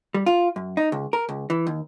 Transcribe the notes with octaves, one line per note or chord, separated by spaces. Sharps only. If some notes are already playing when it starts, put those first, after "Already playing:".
G3
F4
F#2
D#4
C#2
A#4
C#2
E3
D#2